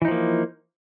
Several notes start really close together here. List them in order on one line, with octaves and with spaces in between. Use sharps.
E3 D#4 F3 A#3